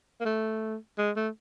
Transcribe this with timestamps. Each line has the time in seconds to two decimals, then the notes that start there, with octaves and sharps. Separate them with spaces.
0.20 A#3
0.25 A3
0.98 G#3
1.16 A3